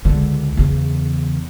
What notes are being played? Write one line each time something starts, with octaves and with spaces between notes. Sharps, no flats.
C#2 D3
E2 C#3